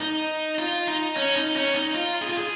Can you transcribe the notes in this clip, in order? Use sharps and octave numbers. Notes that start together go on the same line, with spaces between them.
D#4
F4
D#4
C#4
D#4
C#4
D#4
F4
G#4
F4
G#4